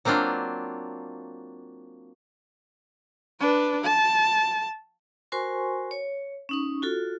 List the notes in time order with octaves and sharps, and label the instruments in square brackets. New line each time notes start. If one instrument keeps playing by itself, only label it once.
[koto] F#3 A#3 C4 D4 F4
[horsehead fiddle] D4 B4
A5
[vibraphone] F#4 A#4 C5 G#5 C6 C#6
C#5
C#4 D#4 C#6
F4 F#4 A4